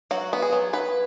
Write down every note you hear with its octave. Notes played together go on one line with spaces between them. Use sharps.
F#3 F#4
B3
G#4
F#3
F#3 B4